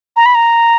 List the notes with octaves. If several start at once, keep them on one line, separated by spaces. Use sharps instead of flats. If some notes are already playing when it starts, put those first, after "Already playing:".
A#5
B5
A#5